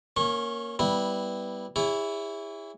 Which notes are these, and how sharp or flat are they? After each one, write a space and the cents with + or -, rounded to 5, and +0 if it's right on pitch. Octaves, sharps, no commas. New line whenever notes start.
A#3 +0 C#4 +0 C#6 -35
G3 +0 B3 +0 E4 -15
E4 +0 G#4 -40 C#5 +35